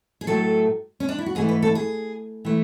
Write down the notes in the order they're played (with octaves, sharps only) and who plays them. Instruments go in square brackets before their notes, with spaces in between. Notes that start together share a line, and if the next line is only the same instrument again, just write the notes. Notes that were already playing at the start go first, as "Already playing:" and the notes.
[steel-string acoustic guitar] G#4
A2 F#3 A3 A4
C#4
D4
E4
F#4
G#2 E3 A3 G#4
B4
A4
G#4
E3 A3